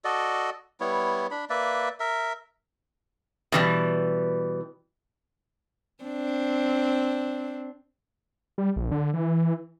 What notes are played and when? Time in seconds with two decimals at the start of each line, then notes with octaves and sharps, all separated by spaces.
0.04 F#4 A4 D5 D#5
0.80 G3 B3 E4 C#5
1.31 D4 B5
1.50 A#3 B4 D5 E5
2.00 A#4 E5
3.52 B2 E3 G3
6.04 C4 D4
8.58 G3
8.76 A#1
8.91 D3
9.14 E3